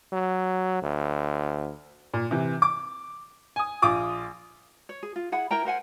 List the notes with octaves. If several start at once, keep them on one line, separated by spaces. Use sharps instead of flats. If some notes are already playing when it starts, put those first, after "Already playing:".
F#3
D2
A#2
C3 E3
D6
G#5 D#6
A#1 F4 D6 D#6
C#5
G#4
F4
E4 G#4 F#5 B5
E4 A#4 G5 A#5
A#4 C5 F#5 G#5